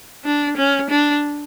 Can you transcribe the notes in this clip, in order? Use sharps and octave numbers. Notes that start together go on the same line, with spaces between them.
D4
C#4
D4